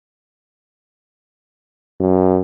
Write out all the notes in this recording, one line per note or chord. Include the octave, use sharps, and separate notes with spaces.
F#2